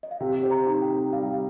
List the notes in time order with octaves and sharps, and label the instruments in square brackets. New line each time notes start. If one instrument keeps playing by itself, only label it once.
[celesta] D#5
F5
[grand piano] C3 [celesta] G5
[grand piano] C5
[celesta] A#5
[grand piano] D#4
[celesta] G5
[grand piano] C3
[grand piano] G3 [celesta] F5
[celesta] G5
F5